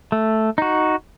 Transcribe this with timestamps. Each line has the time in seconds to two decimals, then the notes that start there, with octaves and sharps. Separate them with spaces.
0.12 A3
0.58 D#4 F#4